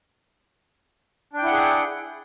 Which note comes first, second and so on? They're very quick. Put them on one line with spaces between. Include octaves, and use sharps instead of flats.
D4 G5 E4 F#5 G#4